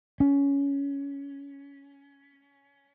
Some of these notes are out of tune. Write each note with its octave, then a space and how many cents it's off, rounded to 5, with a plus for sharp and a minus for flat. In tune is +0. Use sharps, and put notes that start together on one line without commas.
C#4 +15